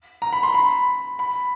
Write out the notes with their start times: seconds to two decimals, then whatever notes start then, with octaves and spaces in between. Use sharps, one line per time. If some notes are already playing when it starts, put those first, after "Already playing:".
0.22 A#5
0.33 B5
0.43 C6
0.54 B5
1.19 B5